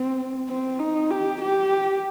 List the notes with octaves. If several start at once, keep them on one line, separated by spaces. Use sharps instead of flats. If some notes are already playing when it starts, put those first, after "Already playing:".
Already playing: C4
C4
D#4
G4
G4